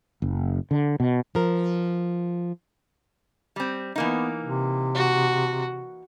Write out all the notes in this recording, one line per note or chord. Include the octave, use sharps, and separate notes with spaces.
F#1
D3
B2
F3 A#4
G3 C4
E3 A#3 B3 D#4
C3
F#4